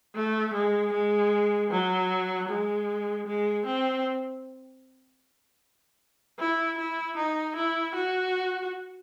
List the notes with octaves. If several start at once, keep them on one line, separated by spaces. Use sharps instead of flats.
A3
G#3
G#3
F#3
G#3
G#3
C4
E4
E4
D#4
E4
F#4